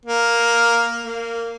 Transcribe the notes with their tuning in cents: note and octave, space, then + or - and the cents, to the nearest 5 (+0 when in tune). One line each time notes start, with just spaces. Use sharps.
A#3 +5
A#3 -15